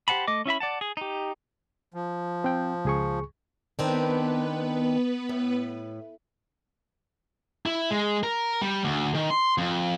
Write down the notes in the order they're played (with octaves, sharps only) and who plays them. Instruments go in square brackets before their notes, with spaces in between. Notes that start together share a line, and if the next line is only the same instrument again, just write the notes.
[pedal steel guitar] G4 C5 F#5 A5 B5
A3 D#5 D6
C#4 E4 E5 B5
D5 F#5 A5
G#4
D#4 G4
[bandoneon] F3
[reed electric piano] C4 G5
C#2 G#4 C#6
[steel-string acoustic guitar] D#3 C4 D4 [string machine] B3 B4
[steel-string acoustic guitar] A2
[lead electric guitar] E4
G#3
A#4
G3
D2
D#3
C6
F2